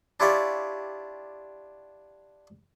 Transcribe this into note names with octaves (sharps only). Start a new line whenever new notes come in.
D4 E4 F4 G4 C#5 D5